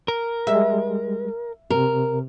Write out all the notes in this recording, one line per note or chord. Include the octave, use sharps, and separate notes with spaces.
A#4
G3 G#3 E5
C3 A#4